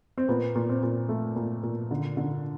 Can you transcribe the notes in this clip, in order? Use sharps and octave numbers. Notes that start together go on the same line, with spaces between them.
C4
A#2 B3
A#2
C4
A#2
A3
A#2
A#2
D3
D3